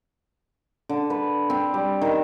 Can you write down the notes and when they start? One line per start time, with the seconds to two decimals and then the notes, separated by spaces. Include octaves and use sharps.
0.89 D3
1.10 B4
1.50 C4
1.74 G3
2.02 D#3